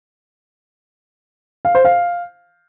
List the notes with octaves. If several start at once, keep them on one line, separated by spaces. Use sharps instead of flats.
F5
C5
F5